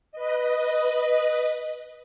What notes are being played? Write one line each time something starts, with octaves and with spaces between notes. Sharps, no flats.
B4 D#5